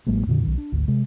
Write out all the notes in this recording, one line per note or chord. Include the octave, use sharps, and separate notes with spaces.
A1 F#3 G#3 A#3
F2 A#2 D3
B1 D#3
D4
G#1 D2
C3 G#3